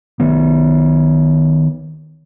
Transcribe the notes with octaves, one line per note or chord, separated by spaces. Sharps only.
D#3 B3